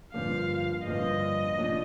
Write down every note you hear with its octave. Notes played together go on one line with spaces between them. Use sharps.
G2 D3 F3 A#3 F4 F5
G2 D3 F3 A#3 F4 D#5
C3 F3 A#3 D4